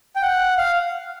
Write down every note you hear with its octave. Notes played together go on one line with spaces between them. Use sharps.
G5
F#5
F5